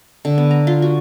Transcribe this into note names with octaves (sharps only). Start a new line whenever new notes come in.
D3
B3
A#5
F4
F#4